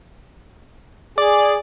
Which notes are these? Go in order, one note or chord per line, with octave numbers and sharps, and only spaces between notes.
G#4 D5